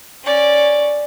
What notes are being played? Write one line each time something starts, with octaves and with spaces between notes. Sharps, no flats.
C#4 D5